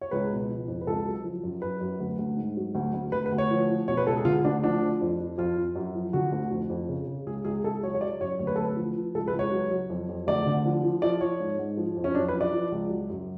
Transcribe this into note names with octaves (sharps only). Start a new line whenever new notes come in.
C#5
C#2 B4
B2
F3
F2
B4
C#2 A4
F#3
F3
F#2
F#2 B4
F#2
D2
D2
G#2
F#3
D2
D2
D2 B4
B4
D2
C#5
F3
F3
B2 C#5
B4
C#2 A4
G#4
D3 F4
D2 D4
F3 D4
F3
F2
F3
F2 F4
F2
F#2
F3
D3 F#4
D2
F2
F2
C#3
C#3
C#2 G#4
C#2 G#4
C#2 A4
F#3 C#5
C#5
F#3 D5
F#2 C#5
D2 C#5
B4
D2 A4
B4
F3
F3
C#2 A4
B4
C#2
C#5
F#3
F#3
F2
F2
D2 D5
D3
F3
F3
F3 D5
F3 C#5
G#2
G#2
F3
F2
C#4
F#2 D4
B4
F3
D5
F3
C#2
F#3
F#2